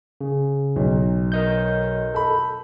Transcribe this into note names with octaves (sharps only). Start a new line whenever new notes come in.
C#3
B1
A#4 D#5 G6
A4 B5